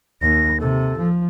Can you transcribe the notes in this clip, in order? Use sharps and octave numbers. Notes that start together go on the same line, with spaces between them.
D#2 A#6
C3 A4
F3